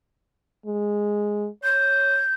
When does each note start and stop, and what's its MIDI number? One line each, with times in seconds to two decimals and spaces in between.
0.66 1.48 56
1.63 2.22 73
1.63 2.34 91